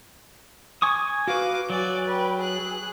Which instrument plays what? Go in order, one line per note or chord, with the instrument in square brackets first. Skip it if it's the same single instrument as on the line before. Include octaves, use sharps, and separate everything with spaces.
[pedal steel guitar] G#5 C#6 D#6
[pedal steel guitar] F#4 B4 [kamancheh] F5 D6
[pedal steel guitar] F#3 [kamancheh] D5 G#5
[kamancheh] B4 G5
G#4 F#6